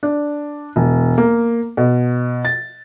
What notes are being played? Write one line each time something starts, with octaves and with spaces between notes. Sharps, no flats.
D4
E1
A#3
B2
A6